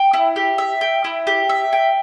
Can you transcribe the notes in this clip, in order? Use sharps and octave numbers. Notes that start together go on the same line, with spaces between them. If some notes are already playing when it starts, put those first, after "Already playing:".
Already playing: G5
E4
G4
E5
G5
E4
G4
E5
G5